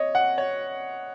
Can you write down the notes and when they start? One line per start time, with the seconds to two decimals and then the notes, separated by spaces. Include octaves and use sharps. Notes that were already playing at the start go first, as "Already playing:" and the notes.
Already playing: C#5 D#5
0.15 F#5
0.38 C#5